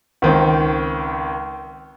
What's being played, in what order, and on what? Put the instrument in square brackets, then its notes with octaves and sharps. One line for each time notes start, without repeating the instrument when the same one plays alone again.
[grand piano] C#2 D#3 C4